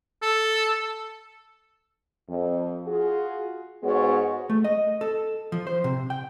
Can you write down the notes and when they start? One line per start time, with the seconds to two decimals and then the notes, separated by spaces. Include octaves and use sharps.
0.23 A4
2.28 F2
2.87 F4 F#4 G#4
3.83 G#2 G#3 B3 F#4 C#5
4.50 A3
4.64 D#5
5.01 A4
5.52 F3
5.67 C5
5.84 C3
6.10 G5